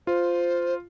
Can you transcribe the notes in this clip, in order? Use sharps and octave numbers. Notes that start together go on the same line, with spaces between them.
F4 C5